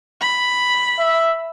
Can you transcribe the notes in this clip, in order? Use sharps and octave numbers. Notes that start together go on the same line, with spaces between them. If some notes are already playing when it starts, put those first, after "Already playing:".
B5
E5